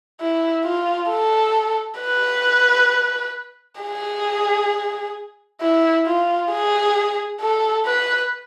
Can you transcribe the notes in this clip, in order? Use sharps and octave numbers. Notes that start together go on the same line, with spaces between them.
E4
F4
A4
B4
G#4
E4
F4
G#4
A4
B4